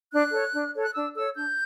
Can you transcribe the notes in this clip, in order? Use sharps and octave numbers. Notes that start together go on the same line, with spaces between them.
D4 F#6
A4 C#5
D4
A4 C#5
F#6
D4 E6
A4 C#5 E6
D4 G6